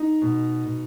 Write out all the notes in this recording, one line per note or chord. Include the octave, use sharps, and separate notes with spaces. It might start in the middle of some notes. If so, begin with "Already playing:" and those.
Already playing: D#4
B2
B2